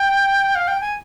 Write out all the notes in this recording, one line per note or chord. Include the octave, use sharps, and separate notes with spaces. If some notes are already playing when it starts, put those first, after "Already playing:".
Already playing: G5
F5
G5
G#5